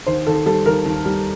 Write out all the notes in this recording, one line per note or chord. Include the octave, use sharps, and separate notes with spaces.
D#2 C5
D#2 A4
G3 A4
D#2 A#4
D#2
G3